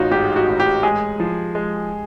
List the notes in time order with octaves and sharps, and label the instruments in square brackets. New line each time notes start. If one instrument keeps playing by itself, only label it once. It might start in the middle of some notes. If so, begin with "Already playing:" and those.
Already playing: [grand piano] A1 [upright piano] D#4 F4 F#4
[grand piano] G#2 [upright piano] G4
[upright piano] F#4
[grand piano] A1
[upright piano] G4
[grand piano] G#3 [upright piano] G#4
[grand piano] F3
G#3